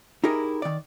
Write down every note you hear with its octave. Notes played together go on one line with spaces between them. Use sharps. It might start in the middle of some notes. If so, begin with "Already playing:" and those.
D#4 E4 G4 G#4 A#4
D#3 D5